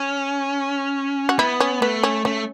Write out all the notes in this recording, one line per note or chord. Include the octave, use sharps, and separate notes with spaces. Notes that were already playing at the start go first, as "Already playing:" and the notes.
Already playing: C#4
F#4
B3 E4
C#4
A3 B3
C#4
A3 C#4